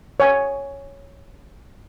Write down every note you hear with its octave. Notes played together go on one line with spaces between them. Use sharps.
C#5 G#5